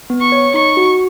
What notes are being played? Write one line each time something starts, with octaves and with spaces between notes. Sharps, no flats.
B3
C#6
C#5
D#4 C#6
F#4